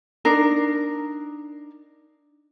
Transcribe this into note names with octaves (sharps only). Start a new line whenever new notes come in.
D4 D#4 A#4